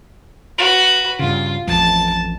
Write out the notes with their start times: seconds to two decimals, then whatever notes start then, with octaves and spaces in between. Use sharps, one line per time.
0.58 F#4 B4
1.19 G2 C#3 F4
1.67 A1 F2 A5